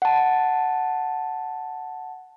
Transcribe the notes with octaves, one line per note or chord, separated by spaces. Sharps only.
F#5 A5